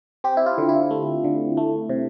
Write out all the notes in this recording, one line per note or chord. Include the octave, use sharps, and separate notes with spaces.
C4 G4
E4
F4
D3
E4
A3
D3
A3
C3